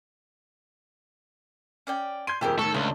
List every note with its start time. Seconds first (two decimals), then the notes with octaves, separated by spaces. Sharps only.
1.87 C#4 D5 G5
2.27 C6 G6 G#6 D#7
2.41 D#1 F2 A3 G4 G#4 A#4
2.59 A2 D#3 A3 A4 C#6
2.74 C#2 A3 D4 D#5